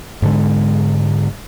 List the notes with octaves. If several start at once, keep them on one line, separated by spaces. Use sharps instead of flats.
G#2 D3 G#3